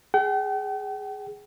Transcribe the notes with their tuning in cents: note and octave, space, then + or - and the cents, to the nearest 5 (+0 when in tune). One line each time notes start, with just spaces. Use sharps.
G#4 +0 G5 -45